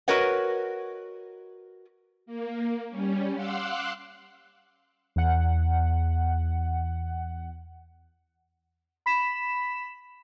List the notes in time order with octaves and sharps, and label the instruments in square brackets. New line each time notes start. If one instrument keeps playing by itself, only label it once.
[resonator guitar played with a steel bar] F#4 A#4 B4 C#5 D#5 F#5
[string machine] A#3
G3 C#4
F5 F#5 C6 D6 E6 F#6
[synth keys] E2 F#5
B5 B6 E7